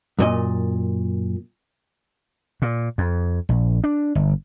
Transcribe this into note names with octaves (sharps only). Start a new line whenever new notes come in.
F#2 A#2 D#5
A#2
F2
A#1
D4
G1